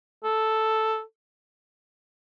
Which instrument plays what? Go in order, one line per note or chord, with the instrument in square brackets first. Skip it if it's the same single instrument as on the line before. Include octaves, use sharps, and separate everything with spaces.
[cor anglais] A4